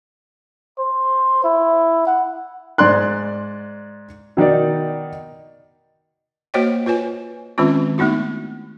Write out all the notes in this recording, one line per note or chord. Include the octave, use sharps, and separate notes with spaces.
C5
E4
F#5
G#2 D5 C6 F#6
B2 D#3 D#4 D5
A#3 F#4 C5 C#5 D#5 G5
F4 B4 C#5 G#5
D#3 G#3 C4 C#4 F4
A3 B3 D#4 E4 F#4